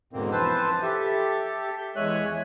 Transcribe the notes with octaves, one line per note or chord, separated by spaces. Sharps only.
E2 G#2 B2 D3 A#3 C4
E3 F3 B4 C5 A5 E6
G4 A4 E5
G6
E2 G#3 C#5 E5 G#5 F#6